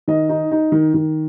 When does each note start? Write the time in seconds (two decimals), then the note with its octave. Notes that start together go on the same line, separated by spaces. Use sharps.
0.08 D#3 D#5
0.29 D#4
0.51 D#4
0.72 D#3
0.94 D#3